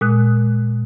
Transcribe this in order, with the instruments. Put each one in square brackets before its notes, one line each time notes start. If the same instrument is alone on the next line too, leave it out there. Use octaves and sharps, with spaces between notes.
[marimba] A#2 G#3 D#6 F#6